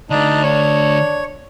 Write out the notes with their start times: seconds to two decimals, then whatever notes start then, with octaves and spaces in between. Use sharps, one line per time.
0.10 D3 A3 D4 D#4
0.43 D4 C#5